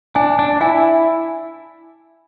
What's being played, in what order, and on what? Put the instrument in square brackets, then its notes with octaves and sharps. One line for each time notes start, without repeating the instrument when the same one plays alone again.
[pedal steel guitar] D4 [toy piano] G#5
[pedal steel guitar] D4
[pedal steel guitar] E4 [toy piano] G#5